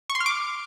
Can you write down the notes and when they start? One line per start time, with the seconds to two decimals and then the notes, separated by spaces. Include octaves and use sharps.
0.10 C#6
0.15 C6
0.20 F6
0.26 D6